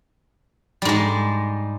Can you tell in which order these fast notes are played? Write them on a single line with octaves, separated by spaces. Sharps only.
G3 G#2 G#3